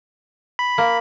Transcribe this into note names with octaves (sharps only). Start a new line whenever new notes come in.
B5
A#3